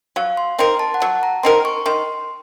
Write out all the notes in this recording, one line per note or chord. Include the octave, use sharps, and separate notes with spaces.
F#3 F5
C6
C4 D#4 A#4 C6
A5
F#5
F#3 A5
A#5
C4 D#4 A#4 C6
C#6
D#3 C6